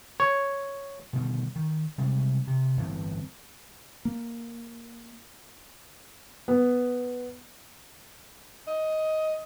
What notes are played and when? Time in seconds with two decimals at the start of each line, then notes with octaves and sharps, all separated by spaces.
0.20 C#5
1.13 B2 D3 D#3 G3
1.56 D#3
1.98 C3 G3 G#3
2.47 C3
2.77 G1 A2 E3 C4
4.05 A#3
6.48 B3
8.67 D#5